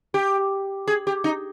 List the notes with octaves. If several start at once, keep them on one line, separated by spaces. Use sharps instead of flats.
G4
G#4
G4
D#4